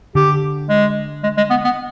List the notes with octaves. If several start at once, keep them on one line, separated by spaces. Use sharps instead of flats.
D3 G4
G#3
G#3
G#3
B3
B3